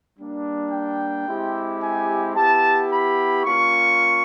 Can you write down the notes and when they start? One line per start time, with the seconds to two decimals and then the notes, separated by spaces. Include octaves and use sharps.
0.18 G3 A#3 D4
0.72 G5
1.26 G#3 C4 E4 G4
1.82 G#5
2.35 B3 E4 G4 A5
2.90 B5
3.45 A#3 C#4 F4 C#6